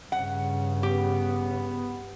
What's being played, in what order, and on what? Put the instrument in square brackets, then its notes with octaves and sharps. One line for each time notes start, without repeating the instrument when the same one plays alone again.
[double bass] G2 C#3 [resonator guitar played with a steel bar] F#5
[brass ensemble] B3 [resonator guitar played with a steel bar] G4